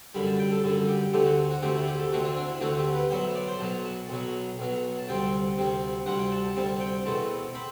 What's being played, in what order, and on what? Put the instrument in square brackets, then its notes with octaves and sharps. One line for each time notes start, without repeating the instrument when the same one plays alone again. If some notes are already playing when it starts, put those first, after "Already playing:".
[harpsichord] F#2 D3 G3 B5
A5
G5
A4
F#2 D3 G3 A4
G4
D2 D3 A3 C4 G4
F#4
F#4
D2 D3 A3 C4 G4
E4
G4
A4
D2 D3 A3 C4 F#4
D4
D4
E4
D2 D3 A3 C4 F#4
G4
B4
B1 B2 F#3 C5
E5
D5
C5
B1 B2 F#3 A5
A5
B1 B2 F#3
B1 B2 F#3
A5
D2 C3 G3 C4 G5
D2 C3 G3 C4
D2 C3 G3 C4 F#5
G5
A5
A5
D2 C3 G3 C4 A5
G5
E2 B2 A3 C4 A5
C4 B5